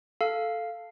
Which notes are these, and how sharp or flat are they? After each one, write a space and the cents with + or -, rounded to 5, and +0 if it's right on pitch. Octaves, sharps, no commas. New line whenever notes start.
A4 +0 F5 -5